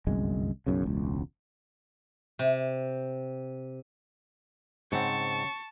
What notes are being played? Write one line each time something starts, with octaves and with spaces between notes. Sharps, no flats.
G1 C2 F#2 G#3
B1 F#2 C#3
E1 C#2
C3
G#2 C#3 C4 F#5 A5 C#6